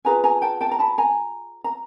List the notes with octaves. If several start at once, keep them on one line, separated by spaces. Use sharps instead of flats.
F4 G#4 B4 G#5 A#5
G#5 A#5
G5 A5
G5 A5
A#5
A5 B5
G#5 A#5
A#5